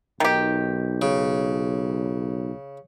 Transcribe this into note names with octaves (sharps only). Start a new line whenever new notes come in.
B1 D#3 G4
C#3